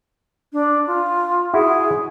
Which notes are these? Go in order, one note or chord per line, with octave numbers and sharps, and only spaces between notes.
D4
F4
E4 F#4 G#4